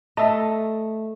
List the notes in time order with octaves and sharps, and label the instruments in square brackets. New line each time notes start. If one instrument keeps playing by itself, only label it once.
[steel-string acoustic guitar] A3 [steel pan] D#5 E5 [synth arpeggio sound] A5